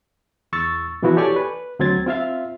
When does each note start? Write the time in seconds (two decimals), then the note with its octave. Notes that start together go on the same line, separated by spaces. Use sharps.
0.53 E2 C#6 E6 A6
1.02 B2 E3 F3 B3 E4 F#4
1.17 G4 A4 C#5 D5 G#5 C#6
1.36 B4
1.79 D2 F#3 C4 G#6 A6
2.06 C4 F4 E5 F5